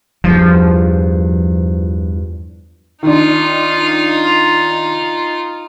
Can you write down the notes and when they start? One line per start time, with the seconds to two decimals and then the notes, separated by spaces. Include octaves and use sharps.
0.24 E2 G2 F3
3.03 D#3 D4 D#4 F4